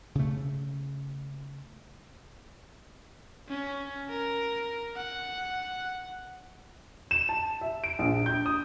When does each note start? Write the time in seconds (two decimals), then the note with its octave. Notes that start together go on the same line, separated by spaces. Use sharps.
0.15 C#3 A3
3.49 C#4
4.10 A#4
4.97 F#5
7.11 E7
7.29 A5
7.61 E5
7.84 D7
7.99 A#1
8.26 G6
8.46 D#6